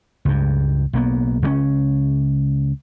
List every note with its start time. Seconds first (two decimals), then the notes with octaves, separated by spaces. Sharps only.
0.25 C#2 G2
0.93 B1 A#3 B3
1.42 C#2 F#3 C#4